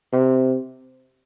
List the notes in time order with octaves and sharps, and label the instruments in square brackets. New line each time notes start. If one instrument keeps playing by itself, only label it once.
[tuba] C3